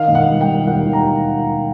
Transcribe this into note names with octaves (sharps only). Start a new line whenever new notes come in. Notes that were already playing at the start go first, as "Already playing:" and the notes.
Already playing: D#3 F5
E1
F#5
G3
G5
G3
D#2 F#5
D#3
A#5